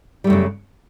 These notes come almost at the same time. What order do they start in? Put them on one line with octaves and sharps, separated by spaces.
G3 A3 F#2 C#3